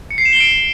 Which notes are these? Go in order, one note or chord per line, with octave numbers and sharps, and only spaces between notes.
C#7
C7
E7
G7
D7